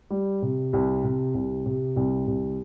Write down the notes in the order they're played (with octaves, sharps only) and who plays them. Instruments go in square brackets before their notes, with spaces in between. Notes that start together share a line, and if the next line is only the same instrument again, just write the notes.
[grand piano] G3
C3
C2
C3
C2
C3
C2
C2